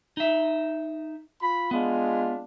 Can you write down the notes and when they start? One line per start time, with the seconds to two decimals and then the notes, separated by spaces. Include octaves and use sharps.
0.17 D#4 E5
1.40 F4 B5
1.71 G#3 B3 D4 F4